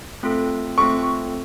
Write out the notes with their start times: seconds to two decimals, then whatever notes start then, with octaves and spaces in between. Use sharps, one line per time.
0.23 A3 C4 F4 A4
0.78 A3 C4 F4 A4 C#6